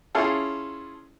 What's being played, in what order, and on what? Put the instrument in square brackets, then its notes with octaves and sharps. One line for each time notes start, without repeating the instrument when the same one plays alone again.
[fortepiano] C#4 E4 F4 G#4 A4